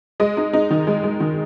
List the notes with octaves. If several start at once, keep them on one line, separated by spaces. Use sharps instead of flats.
G#3 D#5
D#4
D#4
D#3
G#3
G#3
D#3